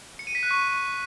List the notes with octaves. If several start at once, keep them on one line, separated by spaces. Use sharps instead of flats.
C#7
D#7
B6
F#6
C#6